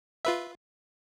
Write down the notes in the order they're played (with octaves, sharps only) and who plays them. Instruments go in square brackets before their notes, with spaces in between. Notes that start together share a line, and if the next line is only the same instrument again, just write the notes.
[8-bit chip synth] F4 B4 E5